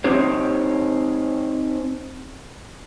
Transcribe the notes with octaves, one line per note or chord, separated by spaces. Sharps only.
C4 D#4 G4 C5 C#5